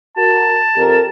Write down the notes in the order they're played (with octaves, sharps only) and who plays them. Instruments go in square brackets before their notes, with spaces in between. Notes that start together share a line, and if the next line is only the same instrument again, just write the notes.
[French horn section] F#4 A#4 [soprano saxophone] A5
[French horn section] F2 G4 A#4